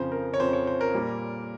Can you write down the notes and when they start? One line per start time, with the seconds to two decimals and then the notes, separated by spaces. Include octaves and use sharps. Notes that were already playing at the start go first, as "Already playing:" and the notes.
Already playing: F2 C#3 F3 C5
0.12 A#4
0.34 C#5
0.39 F2 C#3 F3 C5
0.53 C#5
0.67 C5
0.81 A#4
0.94 A#2 G3 A#3